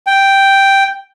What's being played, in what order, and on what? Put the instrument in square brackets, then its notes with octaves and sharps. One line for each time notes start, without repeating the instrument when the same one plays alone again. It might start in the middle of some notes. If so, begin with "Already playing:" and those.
[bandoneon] G5